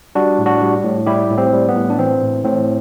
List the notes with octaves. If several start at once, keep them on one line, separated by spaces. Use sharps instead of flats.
G3 D4 F#4
A2
D4 F#4
G3
A2
G3 E4 G4
A2
C4
G3
B3
A2
D4
E3 C4
A2
A2 C4